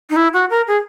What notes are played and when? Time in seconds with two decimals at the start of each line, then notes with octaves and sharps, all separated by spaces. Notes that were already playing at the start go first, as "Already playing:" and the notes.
0.10 D#4
0.16 E4
0.33 F#4
0.50 A#4
0.67 G#4